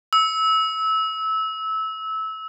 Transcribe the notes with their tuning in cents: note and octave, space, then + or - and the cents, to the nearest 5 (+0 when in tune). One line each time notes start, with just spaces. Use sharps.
E6 -20